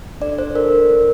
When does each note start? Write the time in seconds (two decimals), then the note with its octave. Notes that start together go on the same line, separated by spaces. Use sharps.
0.21 D4 A4 D5
0.39 C5
0.54 D4 A4 A#4